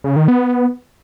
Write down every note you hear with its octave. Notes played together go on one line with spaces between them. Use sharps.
C#3
D#3
B3